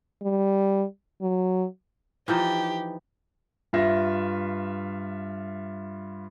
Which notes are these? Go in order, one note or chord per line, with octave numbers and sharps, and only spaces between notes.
G3
F#3
E3 F3 D#4 G4
G2 F4 E5 A#6